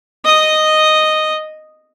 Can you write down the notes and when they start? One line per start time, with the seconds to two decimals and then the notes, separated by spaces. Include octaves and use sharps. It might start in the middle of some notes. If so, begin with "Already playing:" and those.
0.25 D#5 D#6